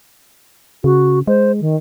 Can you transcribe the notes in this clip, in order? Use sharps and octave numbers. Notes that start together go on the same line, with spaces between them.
C#3 F#4
G#3 C5
D#3